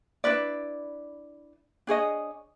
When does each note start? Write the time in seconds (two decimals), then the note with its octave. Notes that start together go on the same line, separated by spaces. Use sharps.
0.24 D4 E4 B4 D5
1.87 D4 G#4 C#5 D#5